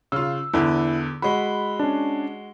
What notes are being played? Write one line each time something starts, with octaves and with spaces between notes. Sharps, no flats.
C#3 F4 E6
E2 D3 E4
G#3 F#4 B5
C#4 D4